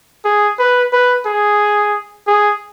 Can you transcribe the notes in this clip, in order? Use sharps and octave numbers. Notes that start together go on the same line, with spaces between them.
G#4
B4
B4
G#4
G#4